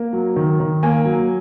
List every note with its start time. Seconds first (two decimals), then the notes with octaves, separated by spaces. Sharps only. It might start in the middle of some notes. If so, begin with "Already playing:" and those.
Already playing: A#3
0.13 F#3
0.36 D#3
0.60 D#3
0.83 A#3 G#5
1.05 F#3